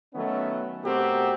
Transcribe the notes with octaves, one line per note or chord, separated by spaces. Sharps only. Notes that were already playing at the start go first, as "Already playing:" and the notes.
D#3 F#3 A3 B3 C#4
B2 A3 C4 F#4 G4 A#4